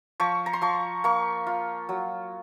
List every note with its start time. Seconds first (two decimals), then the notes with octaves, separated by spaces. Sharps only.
0.20 F3 C#6
0.46 A#5
0.53 C6
0.62 F3 C#6
1.04 A#3 C#6
1.47 F4
1.89 F#3